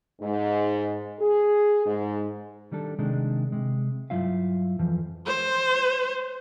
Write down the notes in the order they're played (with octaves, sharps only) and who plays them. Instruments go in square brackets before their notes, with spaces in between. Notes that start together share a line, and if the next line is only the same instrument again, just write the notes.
[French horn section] G#2
G#4
G#2
[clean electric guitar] D#3 G3 D4 A4
C3 D#3 G#3 D4
C3 G#3
G2 F#3 E4 F4 E5 F5
F2 E3 F3
[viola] C5